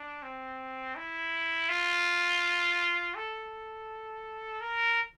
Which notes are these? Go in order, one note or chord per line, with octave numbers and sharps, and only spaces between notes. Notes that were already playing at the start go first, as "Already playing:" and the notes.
Already playing: D4
C4
E4
F4
A4
A#4